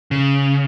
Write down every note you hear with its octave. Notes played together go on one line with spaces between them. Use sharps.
C#3